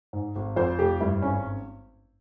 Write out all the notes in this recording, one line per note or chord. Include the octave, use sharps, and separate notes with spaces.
G#2
G#1
F2 C5
F1 G4
G2 E4
G#1 C#4